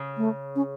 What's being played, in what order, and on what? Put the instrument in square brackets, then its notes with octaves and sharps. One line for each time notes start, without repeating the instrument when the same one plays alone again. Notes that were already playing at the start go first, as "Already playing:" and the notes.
Already playing: [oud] C#3
[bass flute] A3
C#4